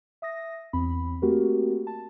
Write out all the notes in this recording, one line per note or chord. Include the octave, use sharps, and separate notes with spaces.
E5 D#6 A#6
E2 C4 B5
A3 A#3 C4 F#4 G4 A#4
A5